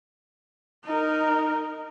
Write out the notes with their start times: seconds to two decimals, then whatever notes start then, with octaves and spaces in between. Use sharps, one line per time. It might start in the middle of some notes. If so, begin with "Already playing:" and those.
0.86 D#4 A#4